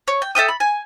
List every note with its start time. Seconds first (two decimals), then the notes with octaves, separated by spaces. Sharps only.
0.08 C#5
0.22 G5
0.35 A4 E5 G5 D#6
0.48 B5
0.60 G#5